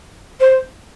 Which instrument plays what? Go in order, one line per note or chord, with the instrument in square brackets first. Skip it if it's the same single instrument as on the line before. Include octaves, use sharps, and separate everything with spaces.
[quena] C5